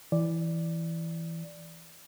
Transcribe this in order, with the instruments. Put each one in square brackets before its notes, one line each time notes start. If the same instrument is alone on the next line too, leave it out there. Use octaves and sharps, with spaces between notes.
[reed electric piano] E3 D5